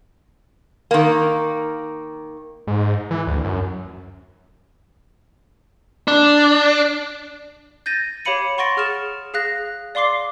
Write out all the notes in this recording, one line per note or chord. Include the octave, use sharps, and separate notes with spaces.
D#3 A#3
G#2
E3
D2
F#2
D4
G6 A6 A#6 D#7
G4 C#5 F5 B5 C#7 D#7
F#5 C6 C#6 A6 A#6 D7
G#4 F6 A6 E7
G#4 F5 F#6 A#6
D5 F5 C6 D6 C7